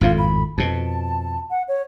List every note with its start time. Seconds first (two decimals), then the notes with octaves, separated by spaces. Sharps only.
0.01 G#1 F2 A2 F4
0.18 B5
0.58 F2 B2 A5
1.50 F#5
1.68 C#5